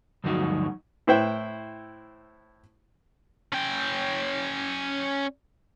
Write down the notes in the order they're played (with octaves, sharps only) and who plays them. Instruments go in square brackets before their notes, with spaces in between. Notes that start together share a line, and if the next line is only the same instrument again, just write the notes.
[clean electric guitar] D2 G2 F3 F#3 D#4 F#4
[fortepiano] A2 E4 B4 C5 E5 G5
[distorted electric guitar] C#4 G5